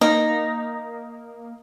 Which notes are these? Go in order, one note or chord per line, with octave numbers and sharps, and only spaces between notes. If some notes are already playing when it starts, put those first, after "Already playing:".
A#3 D#4